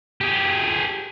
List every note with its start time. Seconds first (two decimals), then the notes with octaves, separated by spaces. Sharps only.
0.21 G4 G#4